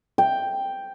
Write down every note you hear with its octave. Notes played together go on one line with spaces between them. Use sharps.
G5